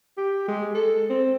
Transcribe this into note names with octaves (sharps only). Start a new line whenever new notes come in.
G4
G#3
A4
C4